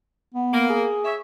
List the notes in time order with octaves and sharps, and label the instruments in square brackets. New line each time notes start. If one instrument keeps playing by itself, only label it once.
[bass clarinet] B3
[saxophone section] A#3
[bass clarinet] G#4
[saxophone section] C#5 E5